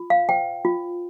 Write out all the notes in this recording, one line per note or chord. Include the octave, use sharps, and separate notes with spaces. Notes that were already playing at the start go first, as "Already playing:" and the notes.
Already playing: F4
F5
C5 G5
F4